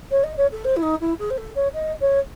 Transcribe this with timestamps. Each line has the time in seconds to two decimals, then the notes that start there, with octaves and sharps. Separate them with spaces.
0.11 C#5
0.23 D#5
0.37 C#5
0.51 A4
0.64 C5
0.76 E4
0.82 D#4
1.01 E4
1.19 G#4
1.30 C5
1.37 A4
1.55 C#5
1.74 D#5
2.00 C#5